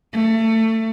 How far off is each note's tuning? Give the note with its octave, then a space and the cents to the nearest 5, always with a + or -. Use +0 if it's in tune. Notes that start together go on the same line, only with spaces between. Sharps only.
A3 +25